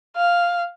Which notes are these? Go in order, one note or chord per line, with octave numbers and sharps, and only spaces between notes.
F5